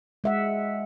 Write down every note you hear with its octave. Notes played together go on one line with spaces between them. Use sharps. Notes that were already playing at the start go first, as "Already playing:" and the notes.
G#3 E5 F#5